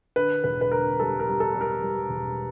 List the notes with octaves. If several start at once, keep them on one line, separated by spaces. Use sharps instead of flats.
D3 B4
E1 B4
B4
D3 A#4
G3 A4
A#4
G3
A4
G3
A#4
G3
E1